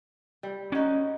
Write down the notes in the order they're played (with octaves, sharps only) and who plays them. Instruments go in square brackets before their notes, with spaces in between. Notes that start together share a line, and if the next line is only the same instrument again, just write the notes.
[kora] G3
[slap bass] C#4 [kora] D#4 F#4